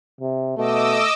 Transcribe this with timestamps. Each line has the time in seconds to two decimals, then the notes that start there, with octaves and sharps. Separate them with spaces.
0.21 C3
0.58 B2 A3 D#5 D6 E6